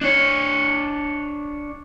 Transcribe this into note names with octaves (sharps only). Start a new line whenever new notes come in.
D4 C#5